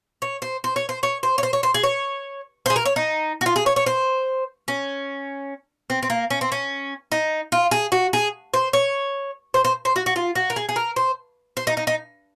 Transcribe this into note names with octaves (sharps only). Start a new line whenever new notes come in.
C#5
C5
C5
C#5
C5
C#5
C5
C#5
C5
C#5
C5
G#4
C#5
C5
G#4
A#4
C#5
D#4
F#4
F4
G#4
C#5
C#5
C5
C#4
C4
C4
A#3
C#4
C4
C#4
D#4
F4
G#4
F#4
G#4
C5
C#5
C5
C5
C5
F#4
F#4
F4
F#4
A#4
G#4
G#4
A#4
C5
C5
D#4
D#4
D#4